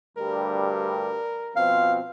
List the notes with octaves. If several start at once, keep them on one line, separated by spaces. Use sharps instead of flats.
D2 G2 G3 A#4
B2 F3 C4 F5